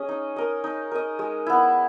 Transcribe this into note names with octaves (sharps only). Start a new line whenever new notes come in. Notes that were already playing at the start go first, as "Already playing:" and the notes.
Already playing: C#4 G#4 D#5
D#4
A#4 D#5
D#4
A#4 D#5
G#3
B3 E4